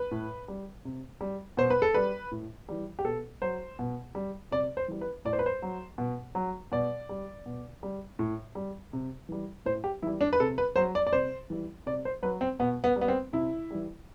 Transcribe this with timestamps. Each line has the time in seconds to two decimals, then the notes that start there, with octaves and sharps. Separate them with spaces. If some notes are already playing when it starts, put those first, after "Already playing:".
Already playing: B4
0.11 A2
0.48 G3
0.85 C3
1.21 G3
1.57 B2 C5
1.70 B4
1.82 A4
1.94 G3 B4
2.31 A2
2.69 E3 G3
2.99 G4
3.04 B2 A4
3.42 F#3 C5
3.79 B2
4.15 G3
4.51 C3 D5
4.77 C5
4.88 E3 G3
5.01 B4
5.25 A2 D5
5.33 C5
5.39 B4
5.46 C5
5.62 F#3
5.98 B2
6.35 F#3
6.72 B2 D5
7.09 G3
7.46 B2
7.83 G3
8.19 A2
8.55 G3
8.93 C3
9.29 E3 G3
9.65 A2 C5
9.84 G4
10.03 E3 G3 E4
10.21 D4
10.33 B4
10.40 C3 A4
10.58 B4
10.76 F#3 C5
10.95 D5
11.07 D5
11.13 C3 C5
11.50 E3 G3
11.86 C3 D5
12.05 C5
12.22 F#3 B4
12.41 C4
12.60 B2 B3
12.84 B3
12.96 G3
13.01 B3
13.08 C4
13.33 C3 E4
13.71 E3 G3